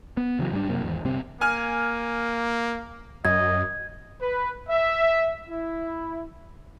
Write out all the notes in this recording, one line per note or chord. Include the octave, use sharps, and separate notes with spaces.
B3
C#3 E3 F#3
G#2 G3 A3 D4
F#2 C3 A#3
G#1 E2
G1 C2 C3 C4
A#3 G#5 F6
F#2 D#5 G#6
B4
E5
E4